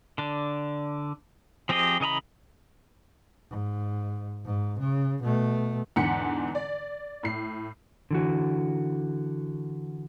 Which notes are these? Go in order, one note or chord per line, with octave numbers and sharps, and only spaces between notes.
D3 D4
F3 C4 G4 G#4 D#5
C#3 E3 D#5 A#5 B5
G#2
G#2
C#3
B2 A3
E2 G#2 D3 F#5 B6 C#7
D5
A2 C7
D3 E3 F#4